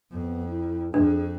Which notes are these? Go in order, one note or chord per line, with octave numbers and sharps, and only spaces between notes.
F2 B3
E4
F2 D4 G#4